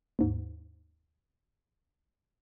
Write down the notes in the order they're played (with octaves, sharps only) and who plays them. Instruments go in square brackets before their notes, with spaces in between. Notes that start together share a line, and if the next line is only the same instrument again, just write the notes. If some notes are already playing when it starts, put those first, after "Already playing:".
[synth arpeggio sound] D#2 G#2